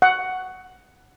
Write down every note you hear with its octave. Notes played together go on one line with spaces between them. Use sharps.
F#5